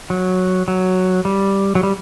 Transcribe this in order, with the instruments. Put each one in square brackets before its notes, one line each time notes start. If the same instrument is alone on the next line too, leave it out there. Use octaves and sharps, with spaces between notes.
[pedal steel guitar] F#3
F#3
G3
F#3
G3